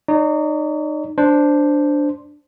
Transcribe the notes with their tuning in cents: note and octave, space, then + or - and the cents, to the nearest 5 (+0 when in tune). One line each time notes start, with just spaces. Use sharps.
D#4 -30 C#5 +45
D4 +0 C5 +0